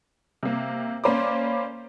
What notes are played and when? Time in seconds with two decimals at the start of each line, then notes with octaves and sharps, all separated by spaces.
0.43 C3 A#3
1.04 A#3 C#4 C5 D5 B5 D6